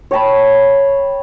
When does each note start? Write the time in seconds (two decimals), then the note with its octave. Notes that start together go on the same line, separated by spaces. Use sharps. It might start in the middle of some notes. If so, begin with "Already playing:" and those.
0.11 C#5 G5 A5 B5